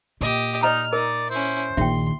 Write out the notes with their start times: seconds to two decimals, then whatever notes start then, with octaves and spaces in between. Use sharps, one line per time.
0.21 A#2 G4 D#5
0.63 D#4 D5 D#5 A#5 F6
0.93 D#4 A#4 D5
1.30 C#4 E4 C5
1.77 A#1 D#3 E5 G5 C6